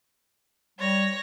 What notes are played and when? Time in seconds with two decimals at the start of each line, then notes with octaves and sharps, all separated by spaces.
0.79 G3 C#5 A#6